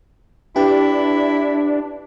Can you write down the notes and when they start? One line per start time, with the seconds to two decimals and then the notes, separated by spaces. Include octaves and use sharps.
0.56 D4 E4 G4 B4